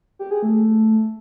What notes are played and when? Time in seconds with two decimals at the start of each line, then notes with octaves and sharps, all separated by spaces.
0.19 G4
0.31 G#4
0.42 A3